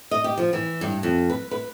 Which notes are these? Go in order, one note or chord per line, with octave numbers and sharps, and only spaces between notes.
D#5
G4
F3
E3
G2
F2
B4
B4